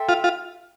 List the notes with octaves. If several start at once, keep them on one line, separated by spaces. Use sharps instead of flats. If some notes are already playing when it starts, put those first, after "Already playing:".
Already playing: A4 E5 G5 C6
F4
F4